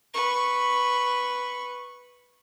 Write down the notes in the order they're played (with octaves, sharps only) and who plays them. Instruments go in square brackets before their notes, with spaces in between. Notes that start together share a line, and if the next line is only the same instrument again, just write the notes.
[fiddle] B4 C#6